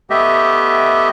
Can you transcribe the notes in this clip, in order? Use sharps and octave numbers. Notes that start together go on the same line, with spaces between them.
A3 B3 G4 D#5 E5